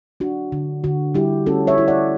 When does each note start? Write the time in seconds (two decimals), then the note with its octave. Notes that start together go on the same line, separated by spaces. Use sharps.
0.20 D4 F#4
0.52 D3
0.84 D3 F#4
1.15 G3 E4 G4
1.46 C#4 F#4 A4
1.67 C#5 E5
1.78 E4
1.88 D5 F#5